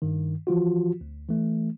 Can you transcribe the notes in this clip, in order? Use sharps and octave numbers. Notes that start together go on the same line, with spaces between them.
G2 D#3
E3 F3 F4 F#4
D2
E3 A3